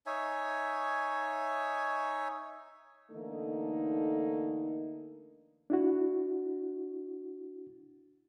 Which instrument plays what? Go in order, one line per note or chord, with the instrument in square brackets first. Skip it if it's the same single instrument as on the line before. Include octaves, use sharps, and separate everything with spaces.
[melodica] D#4 C#5 E5 G#5
[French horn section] D3 E3 A3 A#3 D#4
[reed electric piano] D4 E4 F#4